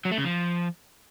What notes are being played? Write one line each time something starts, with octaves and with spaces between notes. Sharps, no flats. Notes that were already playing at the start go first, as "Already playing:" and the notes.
F#3
A3
C#3
F3